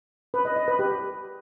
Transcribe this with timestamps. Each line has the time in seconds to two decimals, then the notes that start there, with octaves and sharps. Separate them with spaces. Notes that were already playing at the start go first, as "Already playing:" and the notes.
0.34 B4
0.45 D#5
0.56 D#5
0.68 B4
0.79 G4